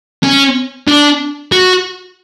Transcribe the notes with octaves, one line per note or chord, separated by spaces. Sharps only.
C#4
D4
F#4